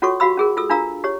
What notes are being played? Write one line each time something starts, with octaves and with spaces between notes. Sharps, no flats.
C#4 F4 F#4 A4 C#5 C#6
F#4 G4 F5 B5 E6
C#4 G#4 A#4
F4 A4 E6
D4 F4 A#4 F5 A#5 E6
G4 C#5